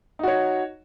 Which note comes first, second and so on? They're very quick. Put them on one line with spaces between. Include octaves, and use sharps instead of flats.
D#4 F#4 C#5